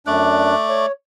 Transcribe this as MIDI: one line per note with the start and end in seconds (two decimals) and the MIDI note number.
0.07 0.55 42
0.07 0.86 57
0.07 0.55 62
0.07 0.86 74
0.07 0.55 90
0.69 0.92 73